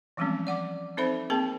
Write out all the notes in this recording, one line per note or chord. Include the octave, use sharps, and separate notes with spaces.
E3 F3 G3 G#3 C4 C#4
D5 F#5 D6
C4 D#4 A4 C5 E5 B5
A#3 C4 G#4 A#4 A5